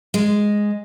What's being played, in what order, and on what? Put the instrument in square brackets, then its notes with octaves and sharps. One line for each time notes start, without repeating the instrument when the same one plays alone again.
[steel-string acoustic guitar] G#3